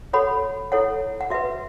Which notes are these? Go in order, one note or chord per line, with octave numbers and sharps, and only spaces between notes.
F#4 A4 C#5 F#5 B5
E4 A4 C#5 F#5
F#5
F#4 B4 E5